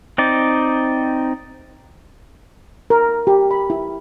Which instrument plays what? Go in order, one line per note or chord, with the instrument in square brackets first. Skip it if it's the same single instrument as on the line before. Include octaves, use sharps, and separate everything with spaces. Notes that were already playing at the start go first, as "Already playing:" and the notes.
[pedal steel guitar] C4 D#4 D5
[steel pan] A#4
G4
B5
E4